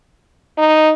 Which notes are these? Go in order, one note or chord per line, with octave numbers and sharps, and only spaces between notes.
D#4